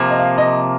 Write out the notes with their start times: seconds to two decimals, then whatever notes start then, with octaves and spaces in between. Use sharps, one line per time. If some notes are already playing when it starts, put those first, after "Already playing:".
Already playing: C3 F3 A#3
0.10 D#5
0.20 F5
0.38 D#5